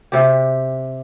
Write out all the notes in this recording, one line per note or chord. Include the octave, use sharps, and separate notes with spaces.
C3 G4